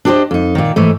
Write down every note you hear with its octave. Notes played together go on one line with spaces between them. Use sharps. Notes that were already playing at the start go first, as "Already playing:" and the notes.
D4 G4 A4 B4 C5 D#5
F2 D#4
A#2 D#3
G#2 E3 A3